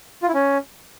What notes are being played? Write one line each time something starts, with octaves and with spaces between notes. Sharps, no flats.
F4
E4
C#4